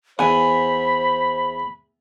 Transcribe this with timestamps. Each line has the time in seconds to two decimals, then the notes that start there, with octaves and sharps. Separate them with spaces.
0.19 E2 C5 F#5 G#5 B5